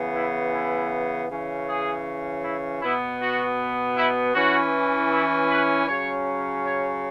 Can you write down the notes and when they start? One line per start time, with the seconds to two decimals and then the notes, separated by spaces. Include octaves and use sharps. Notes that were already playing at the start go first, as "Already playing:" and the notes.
Already playing: C#3 E3 B3
0.14 E4
0.52 E4
1.28 C#3 E3 C#4
1.67 G#4
2.43 E4
2.81 B2 B3 E4
3.20 F#4
3.96 E4
4.34 E3 C#4 F#4
5.11 E4
5.49 B4
5.87 C#3 F#3 C#4 C#5
6.63 C#5